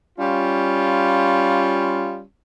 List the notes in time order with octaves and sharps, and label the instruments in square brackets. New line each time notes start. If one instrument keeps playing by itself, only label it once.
[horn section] G3 C#4 F4